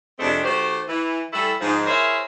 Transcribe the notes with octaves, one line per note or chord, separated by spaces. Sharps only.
F2 C3 G#3 A3 C4 D4
D#3 A3 F#4 G4 C5
E3
E3 G3 A3 E4 A4
G#2 F3 G#3
E4 G#4 A#4 C5 C#5 E5